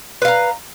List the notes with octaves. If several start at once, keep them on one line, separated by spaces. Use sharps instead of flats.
B4 F5 A#5